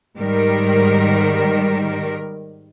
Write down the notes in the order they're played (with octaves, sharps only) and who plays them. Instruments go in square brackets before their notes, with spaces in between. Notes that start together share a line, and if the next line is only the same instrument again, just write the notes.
[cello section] G#2 D#3 G3 A#4